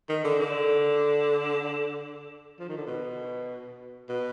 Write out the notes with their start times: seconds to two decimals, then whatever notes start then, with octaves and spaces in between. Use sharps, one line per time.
0.09 D#3
0.24 D3
0.40 D3
2.59 F3
2.68 D#3
2.77 D3
2.86 B2
4.09 B2